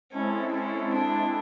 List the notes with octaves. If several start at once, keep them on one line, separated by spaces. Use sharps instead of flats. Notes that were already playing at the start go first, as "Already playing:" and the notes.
G#3 C4 C#4 E4 A4
C#4
D4